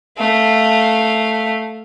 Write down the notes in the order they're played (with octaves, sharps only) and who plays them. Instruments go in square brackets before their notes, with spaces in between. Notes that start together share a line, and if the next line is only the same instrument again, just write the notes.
[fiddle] A3 F5